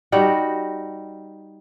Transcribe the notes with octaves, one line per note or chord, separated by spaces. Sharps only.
G3 D#4 F#4